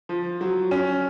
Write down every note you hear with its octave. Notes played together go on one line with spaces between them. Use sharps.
F3
F#3
C#4